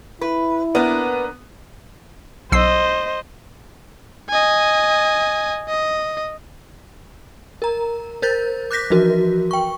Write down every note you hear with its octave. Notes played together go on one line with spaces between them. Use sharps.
E4 B4
A#3 B3 D4
B1 C5 D#5 E6 C7
D#5 G#5
D#5
A#4 A#5
A#4 C5 G6 A6
D6 F#6 G6 A#6 B6
E3 F3 F#4 A#4
G5 C#6